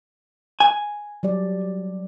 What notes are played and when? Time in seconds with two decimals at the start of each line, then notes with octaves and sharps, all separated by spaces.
0.60 G#5
1.23 F#3 G3 D5